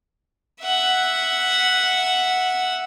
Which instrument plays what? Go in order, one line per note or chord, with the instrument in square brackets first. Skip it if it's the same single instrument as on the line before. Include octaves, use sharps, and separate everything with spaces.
[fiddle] E5 F#5